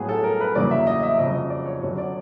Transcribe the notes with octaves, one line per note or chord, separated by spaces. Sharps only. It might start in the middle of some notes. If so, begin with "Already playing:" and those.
Already playing: A2 F#3 B3 G#4
A4
A#4
B4
E2 C#3 F#3 A#3 D5
E5
D#5
E5
F2 C#3 F#3 D#5
D#5
D5
C#5
F#2 D3 F#3 B3 C#5
D5